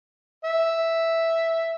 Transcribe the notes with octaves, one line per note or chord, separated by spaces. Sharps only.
E5